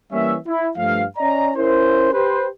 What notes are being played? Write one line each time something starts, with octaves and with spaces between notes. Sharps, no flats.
E3 G3 A#3 C#4 E5
E4
G2 F3 A3 F5
C#4 D5 D#5 A#5
C#4 E4 A#4 C5
G4 B4 C5